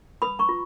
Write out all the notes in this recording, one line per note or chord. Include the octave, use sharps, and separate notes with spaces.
B4 B5 D#6
A#5 C#6
F4